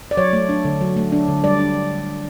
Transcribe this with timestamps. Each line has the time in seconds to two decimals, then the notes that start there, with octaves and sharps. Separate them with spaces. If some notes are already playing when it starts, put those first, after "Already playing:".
0.11 D5
0.17 F#3 C#5
0.33 A3
0.49 D4
0.65 D3
0.81 F#3
0.97 A3
1.12 D4
1.28 D3
1.44 G3 D5
1.59 D4